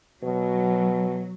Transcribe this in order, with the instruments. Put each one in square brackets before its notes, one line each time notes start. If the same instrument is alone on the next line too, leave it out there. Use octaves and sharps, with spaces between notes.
[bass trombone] B2 [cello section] F#3